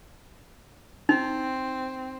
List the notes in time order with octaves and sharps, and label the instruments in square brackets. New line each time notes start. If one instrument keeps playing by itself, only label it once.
[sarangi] C4 [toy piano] D#4